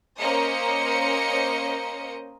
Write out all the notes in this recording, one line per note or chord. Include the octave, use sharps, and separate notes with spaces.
A#3 C#4 A#4 C5 D#5 C#7